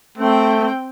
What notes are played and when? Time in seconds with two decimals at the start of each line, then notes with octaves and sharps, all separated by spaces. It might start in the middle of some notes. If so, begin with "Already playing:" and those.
0.18 A3 C4 G5